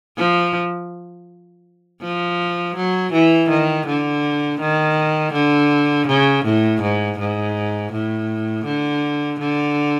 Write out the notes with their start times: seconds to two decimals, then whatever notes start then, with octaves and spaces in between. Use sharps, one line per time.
0.17 F3
2.02 F3
2.76 F#3
3.12 E3
3.49 D#3
3.87 D3
4.60 D#3
5.33 D3
6.07 C#3
6.45 A2
6.82 G#2
7.19 G#2
7.92 A2
8.65 D3
9.39 D3